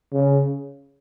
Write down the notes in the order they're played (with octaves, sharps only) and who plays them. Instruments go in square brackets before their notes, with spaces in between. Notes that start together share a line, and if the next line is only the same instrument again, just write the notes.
[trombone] C#3